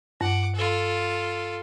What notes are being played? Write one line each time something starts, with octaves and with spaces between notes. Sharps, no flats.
G2 F#5 D6
F4 A4